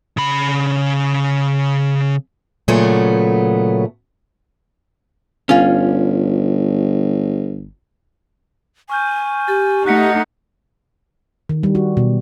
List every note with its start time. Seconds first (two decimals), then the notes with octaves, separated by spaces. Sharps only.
0.17 C#3 B5
2.68 A#2 C#3 F#3 A3 B3
5.49 G1 C#4 F4
8.90 G#5 C#6 F6 G6
9.48 G4 A6
9.86 A3 D#4 F#5 F#6 B6 C#7
11.49 D#3
11.63 G3
11.75 F#4
11.97 B2